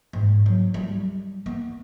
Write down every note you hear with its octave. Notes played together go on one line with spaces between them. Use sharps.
G#2
F#3
G3
B3